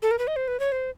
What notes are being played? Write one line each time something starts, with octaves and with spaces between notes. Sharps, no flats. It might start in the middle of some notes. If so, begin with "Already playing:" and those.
A4
A#4
B4
D#5
C5
B4
C#5
C5